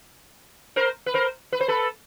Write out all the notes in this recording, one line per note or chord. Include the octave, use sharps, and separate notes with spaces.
A#4 C5
B4
A#4 C5
B4
C5
A4 B4